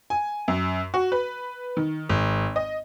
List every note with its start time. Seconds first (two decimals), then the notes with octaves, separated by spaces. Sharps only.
0.10 G#5
0.48 F#2
0.94 F#4
1.12 B4
1.77 D#3
2.09 G#1
2.56 D#5